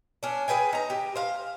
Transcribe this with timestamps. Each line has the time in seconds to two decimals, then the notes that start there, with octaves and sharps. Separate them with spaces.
0.23 C#4 D4
0.48 G#4 B4 G5 G#5
0.73 D#4 A#5
0.90 G4
1.16 C5 F5